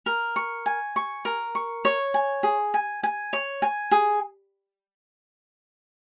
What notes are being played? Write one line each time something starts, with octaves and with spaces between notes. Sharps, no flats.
A#4
C#6
G#5
C#6
A#4
C#6
C#5
G#5
G#4
G#5
G#5
C#5
G#5
G#4